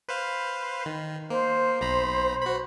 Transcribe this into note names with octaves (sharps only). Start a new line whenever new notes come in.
B4 C5 F5
D#3
A#3 C5
B1 A#5 B5
F#4 B5